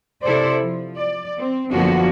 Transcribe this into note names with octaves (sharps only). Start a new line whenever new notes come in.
C3 E4 A4 C5 D5
F3
D5
C4
F#2 D3 F3 A#3 B3 F#4